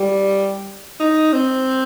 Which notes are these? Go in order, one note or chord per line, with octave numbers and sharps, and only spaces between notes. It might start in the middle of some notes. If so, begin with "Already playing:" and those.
Already playing: G3
D#4
C4